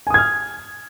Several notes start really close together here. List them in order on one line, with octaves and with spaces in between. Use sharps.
G#5 D#6 G#6 F6